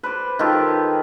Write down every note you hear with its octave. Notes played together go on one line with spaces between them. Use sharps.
B4 C5 D5
D#3 F4 G4 A4